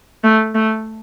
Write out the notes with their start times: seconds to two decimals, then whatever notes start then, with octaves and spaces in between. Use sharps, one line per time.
0.24 A3
0.55 A3